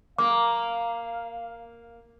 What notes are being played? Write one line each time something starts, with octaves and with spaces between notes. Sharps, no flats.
A#3 F5 D6